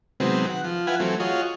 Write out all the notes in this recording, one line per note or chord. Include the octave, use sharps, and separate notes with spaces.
C3 D#3 F#3 G#3 B3 C4
F#5
F3
E4 F4 B4 F#5 G#5
E3 F#3 A3 C4
F4 F#4 G#4 C#5 D#5